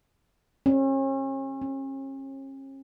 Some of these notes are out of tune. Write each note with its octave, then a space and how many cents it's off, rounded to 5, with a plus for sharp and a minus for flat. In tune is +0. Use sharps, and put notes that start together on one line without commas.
C#4 -40
C#4 -40